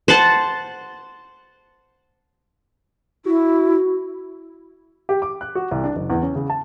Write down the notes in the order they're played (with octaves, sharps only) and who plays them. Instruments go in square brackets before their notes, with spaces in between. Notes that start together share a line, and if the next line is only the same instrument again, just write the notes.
[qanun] C5 F#5 A5
[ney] E4 [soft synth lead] F#4
[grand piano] G4
D6
F#6
F#4
C2
D4
F#1
E2
C#4
C#3
A5